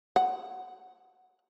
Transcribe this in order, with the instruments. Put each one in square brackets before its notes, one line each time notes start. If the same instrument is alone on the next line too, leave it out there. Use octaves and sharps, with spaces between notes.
[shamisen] F#5